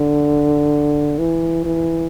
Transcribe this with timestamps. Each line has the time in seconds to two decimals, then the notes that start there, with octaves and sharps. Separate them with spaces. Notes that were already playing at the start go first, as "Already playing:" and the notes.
Already playing: D3
1.18 E3
1.65 E3